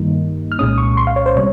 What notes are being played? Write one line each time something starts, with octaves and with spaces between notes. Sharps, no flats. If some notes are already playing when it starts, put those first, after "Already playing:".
Already playing: G2 D#3 G3 A#3 D#4
F6
C2 A#2 G#3 C#4 D#6
C#6
C6
F5
C#5
C5
C3 G3 C#5